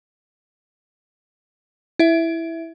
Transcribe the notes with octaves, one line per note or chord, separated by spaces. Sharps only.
E4 E5